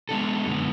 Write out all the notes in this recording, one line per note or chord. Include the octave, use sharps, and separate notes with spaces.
G#3 B3 D4 A4
F#2 D3 G#3 B3